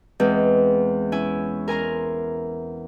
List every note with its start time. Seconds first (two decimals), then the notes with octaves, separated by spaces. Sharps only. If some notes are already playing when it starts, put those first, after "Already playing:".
0.20 E2 G#3 B3 C4
1.12 C#4 E4 G#5
1.68 A#4 G#5 A#5 C6